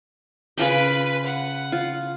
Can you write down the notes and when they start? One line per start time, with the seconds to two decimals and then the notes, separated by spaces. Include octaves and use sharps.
0.57 C#3 F4 B4 G5
1.26 F#5
1.72 F4